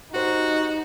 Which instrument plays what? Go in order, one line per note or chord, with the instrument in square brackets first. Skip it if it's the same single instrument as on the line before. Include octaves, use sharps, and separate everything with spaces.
[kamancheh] D#4 [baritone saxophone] F#4 [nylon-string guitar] G4 C5